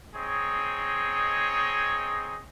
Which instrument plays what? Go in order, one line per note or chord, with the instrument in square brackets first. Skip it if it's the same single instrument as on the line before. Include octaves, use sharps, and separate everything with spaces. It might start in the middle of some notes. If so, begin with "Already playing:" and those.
[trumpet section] C4 D#4 G#4 C#5 D#5